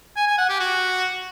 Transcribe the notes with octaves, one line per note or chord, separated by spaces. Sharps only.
G#5
G#5
F#5
G4
F#4